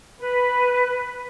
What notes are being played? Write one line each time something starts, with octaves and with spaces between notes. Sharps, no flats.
B4